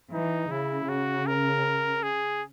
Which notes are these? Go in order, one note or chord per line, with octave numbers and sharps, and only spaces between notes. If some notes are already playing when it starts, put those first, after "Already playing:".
E3 D#4
C#3 E4
C#3 F#4
A#4
G#4